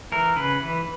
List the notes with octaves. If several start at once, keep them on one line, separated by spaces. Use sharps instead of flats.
E3 A#4
C#3 B4
E3